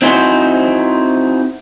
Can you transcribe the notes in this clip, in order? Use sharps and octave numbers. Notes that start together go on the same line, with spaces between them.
C4 D#4 E4 F#4 G#4 C5